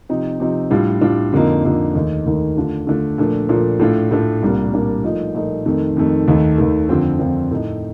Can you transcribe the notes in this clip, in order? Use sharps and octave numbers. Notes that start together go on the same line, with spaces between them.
C3 F3 C4 D#4
C3 F3 C4 D#4
A2 G3 D4 F4
A2 G3 D4 F4
F2 D3 F3 A#3 D#4
F2 D3 F3 A#3 D#4
D#2 D#3 A3 D#4
D#2 D#3 A3 D#4
D3 A3 D4 F4
D3 A3 D4 F4
A#2 F3 A3 D4
A#2 F3 A3 D4
A2 A3 D4 F4
A2 A3 D4 F4
C2 A#2 G3 A#3 D4
C2 A#2 G3 A#3 D4
A#2 F3 A3 D#4
A#2 F3 A3 D#4
F2 D#3 A3
F2 D#3 A3
D#2 D#3 A3
D#2 D#3 A3
F2 D3 F3 C4 F4
F2 D3 F3 C4 F4
A2 A3 D#4